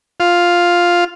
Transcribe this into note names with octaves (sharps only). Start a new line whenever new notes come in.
F4